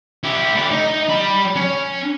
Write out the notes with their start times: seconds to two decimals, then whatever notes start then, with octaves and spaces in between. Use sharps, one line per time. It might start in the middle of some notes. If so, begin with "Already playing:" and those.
0.24 E4 G4
0.55 A3 D5
0.71 D#4
1.09 G3 B5
1.56 C#4